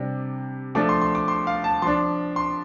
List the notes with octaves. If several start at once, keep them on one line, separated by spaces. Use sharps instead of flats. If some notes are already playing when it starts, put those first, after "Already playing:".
Already playing: C3 G3 D4
F3 A3 D4 D6
C6
C6
D6
C6
F5
A5
F3 D4 C6
C6